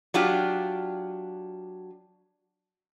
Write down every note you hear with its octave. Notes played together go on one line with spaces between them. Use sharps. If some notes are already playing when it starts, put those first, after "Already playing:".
F#3 D4 F4 G4